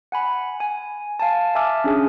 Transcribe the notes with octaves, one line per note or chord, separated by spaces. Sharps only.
F#5 G#5 B5
G#5
F5 G#5 A5
E5 G#5 A5 D6 E6 F6
C#4 D4 G#4 G#5